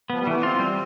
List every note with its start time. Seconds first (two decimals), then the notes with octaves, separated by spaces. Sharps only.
0.10 F3 B3
0.20 G3
0.27 E3 A3
0.35 B3
0.43 C4 F4
0.59 G3